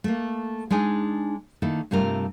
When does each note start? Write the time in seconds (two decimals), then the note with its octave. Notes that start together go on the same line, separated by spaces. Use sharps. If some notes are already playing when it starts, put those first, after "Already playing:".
0.04 A3 A#3
0.71 G#3 D4 D#4 G#5
1.62 D#3 A#3 E4 A4
1.91 G2 C3 G3 A3 F4 A#4